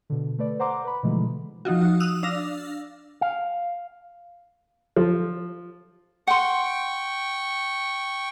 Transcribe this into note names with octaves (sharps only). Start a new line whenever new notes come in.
B2 D3
A3 B4 D5
C5 F#5 A#5 C6 D6
B4 B5
B2 D3 E3 F3 G#3 A3
F3 D#4 F4 F#4
D#6 E6 F#6 F7
D4 F5 E6 A#6
F5
F3
F#5 G5 C6 C#6